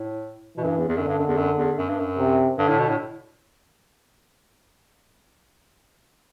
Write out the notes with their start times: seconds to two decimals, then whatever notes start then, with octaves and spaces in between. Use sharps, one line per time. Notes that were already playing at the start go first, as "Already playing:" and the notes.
Already playing: A2
0.57 B2 E3
0.63 F#2
0.67 G2
0.78 E2
0.88 E2
0.97 F#2 D3
1.08 G2
1.18 F#2
1.28 E2
1.37 F#2
1.58 E2
1.78 F#2
1.89 G2
1.99 F#2
2.18 C3
2.58 G2 D3
2.69 A2
2.79 B2
2.89 A2